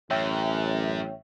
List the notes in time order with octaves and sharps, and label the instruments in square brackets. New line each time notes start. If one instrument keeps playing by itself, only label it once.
[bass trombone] A1 [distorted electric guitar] F#2 [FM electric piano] C#5 E5 G5